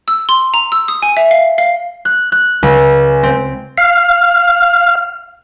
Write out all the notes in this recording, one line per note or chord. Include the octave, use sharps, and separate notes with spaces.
E6
C6
A#5
E6
D#6
G#5
E5
F5
F5
F#6
F#6
C#2
C4
F5 F6